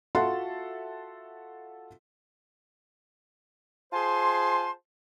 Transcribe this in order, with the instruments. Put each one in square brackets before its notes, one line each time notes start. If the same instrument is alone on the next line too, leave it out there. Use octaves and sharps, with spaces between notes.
[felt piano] F4 F#4 A4 E5 F#5 C6
[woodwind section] F4 G#4 C5 G#5 A5 C6